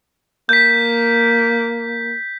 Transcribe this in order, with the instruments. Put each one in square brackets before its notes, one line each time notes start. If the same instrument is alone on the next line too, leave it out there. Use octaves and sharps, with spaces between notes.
[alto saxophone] A#3 [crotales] G6 B6